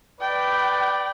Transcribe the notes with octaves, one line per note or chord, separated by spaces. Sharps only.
B4 D5 G5